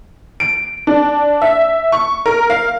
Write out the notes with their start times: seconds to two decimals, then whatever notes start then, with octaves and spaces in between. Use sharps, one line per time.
0.40 D7
0.87 D4
1.42 E5
1.92 C#6
2.26 A#4
2.50 F5